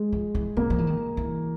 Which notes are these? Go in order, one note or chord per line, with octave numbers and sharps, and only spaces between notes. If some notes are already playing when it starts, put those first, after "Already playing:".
Already playing: G#3
F3
E3
D3 A#3
F3
E3
D#3
E3